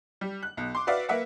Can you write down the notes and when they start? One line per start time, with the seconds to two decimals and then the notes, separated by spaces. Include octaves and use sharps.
0.21 G3
0.43 F#6
0.57 B1
0.75 C6 D6
0.87 F#4 B4 D5 E5 F5
1.09 A#3 B4 E5 F#5